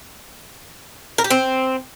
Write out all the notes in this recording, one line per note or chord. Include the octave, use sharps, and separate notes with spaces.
A#4
G4
C4